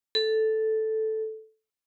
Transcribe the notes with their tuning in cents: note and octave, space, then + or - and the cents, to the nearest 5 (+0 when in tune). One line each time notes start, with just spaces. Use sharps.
A4 -5